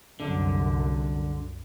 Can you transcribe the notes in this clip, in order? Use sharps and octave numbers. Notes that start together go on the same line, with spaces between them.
C2 F#2 D3